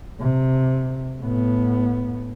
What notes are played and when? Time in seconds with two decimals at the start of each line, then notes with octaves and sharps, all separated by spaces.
0.20 C3
1.22 A2 B3